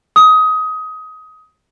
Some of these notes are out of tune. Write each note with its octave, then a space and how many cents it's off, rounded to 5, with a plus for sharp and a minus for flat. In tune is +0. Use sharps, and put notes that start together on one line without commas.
D#6 +20